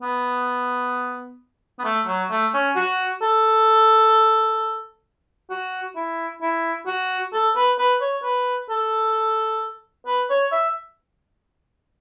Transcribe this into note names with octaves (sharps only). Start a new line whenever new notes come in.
B3
B3
A3
F#3
A3
C#4
F#4
A4
F#4
E4
E4
F#4
A4
B4
B4
C#5
B4
A4
B4
C#5
E5